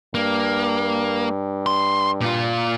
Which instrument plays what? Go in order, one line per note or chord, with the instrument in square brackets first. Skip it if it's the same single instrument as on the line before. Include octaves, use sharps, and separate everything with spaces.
[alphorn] G2 [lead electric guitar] A#3
[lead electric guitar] C6
A#2 F4